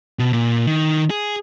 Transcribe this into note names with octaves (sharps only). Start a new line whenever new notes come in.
B2
A#2
D#3
G#4